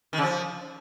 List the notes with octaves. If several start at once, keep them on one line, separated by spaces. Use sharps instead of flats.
D#3
C#3
F3